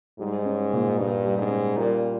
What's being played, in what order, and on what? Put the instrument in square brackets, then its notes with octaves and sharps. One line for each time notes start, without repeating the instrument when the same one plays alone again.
[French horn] G#2 [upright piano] G3
[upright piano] C#4
A#2
[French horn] G2 [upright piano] A#2
[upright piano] G3
[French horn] G#2
[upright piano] C#4
[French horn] A#2 [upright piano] G3
[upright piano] A#3